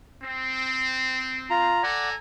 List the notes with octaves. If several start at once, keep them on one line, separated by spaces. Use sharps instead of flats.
C4
F4 A#5
A4 D5 F#5 G#5 A#5